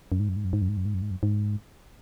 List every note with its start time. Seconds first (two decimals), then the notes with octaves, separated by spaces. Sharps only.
0.12 F#2
0.20 G#2
0.29 F#2
0.36 G#2
0.45 F#2
0.53 G#2
0.62 F#2
0.69 G#2
0.77 F#2
0.85 G#2
0.94 F#2
1.02 G#2
1.11 F#2
1.23 G#2